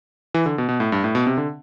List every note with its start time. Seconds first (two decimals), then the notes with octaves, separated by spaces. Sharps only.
0.34 E3
0.46 D3
0.58 B2
0.69 B2
0.80 A2
0.92 G2
1.04 A2
1.15 B2
1.27 C3
1.37 D3